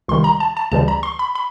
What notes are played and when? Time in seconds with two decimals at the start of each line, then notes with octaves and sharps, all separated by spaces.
0.08 C#2 C3 D#3 G3 C6
0.24 A#5
0.40 A5
0.57 A5
0.72 D2 C#3 E3 G3 A5
0.88 A#5
1.03 C6
1.19 B5
1.35 B5